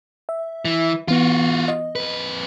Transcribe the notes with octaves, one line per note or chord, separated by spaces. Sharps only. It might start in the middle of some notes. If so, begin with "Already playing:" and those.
E5
E3
E3 B3 F4 F#4
D#5
F2 B4